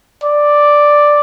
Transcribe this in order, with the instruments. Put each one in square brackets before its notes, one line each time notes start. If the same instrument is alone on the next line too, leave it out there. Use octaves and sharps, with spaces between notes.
[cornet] D5